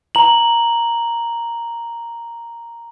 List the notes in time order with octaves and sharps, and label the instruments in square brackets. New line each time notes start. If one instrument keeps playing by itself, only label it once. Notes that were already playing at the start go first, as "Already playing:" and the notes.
[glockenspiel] A#5 F#7